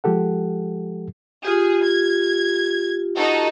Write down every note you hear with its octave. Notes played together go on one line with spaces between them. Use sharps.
F3 G#3 G4 A4 F#5
F4 G4 G#4
G#6
D#4 F#4 A4